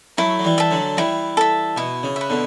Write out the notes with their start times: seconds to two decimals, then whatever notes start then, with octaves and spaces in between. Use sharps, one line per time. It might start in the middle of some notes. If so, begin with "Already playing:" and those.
0.18 F#3 A3 E4
0.39 F#3
0.44 E3 G3
0.58 A4 E5
0.71 D3 F#3
0.97 E3 G3 E4
1.37 A4 E5
1.77 B2 E4
2.03 C#3
2.16 E5
2.21 B4
2.30 B2 D3